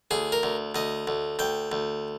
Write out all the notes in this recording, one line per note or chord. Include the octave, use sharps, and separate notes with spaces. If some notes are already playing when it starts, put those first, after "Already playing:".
D2 G#4
A#4
D2
D2 D#5
D2
D2 G5
D2